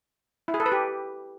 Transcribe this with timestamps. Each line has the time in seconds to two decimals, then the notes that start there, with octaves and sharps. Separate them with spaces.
0.48 E4
0.54 G#4
0.60 A4
0.66 B4
0.72 G4